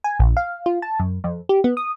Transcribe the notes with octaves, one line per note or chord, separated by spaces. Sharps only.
G#5
A#1
F5
F4
A5
F#2
F2
G4
B3
D#6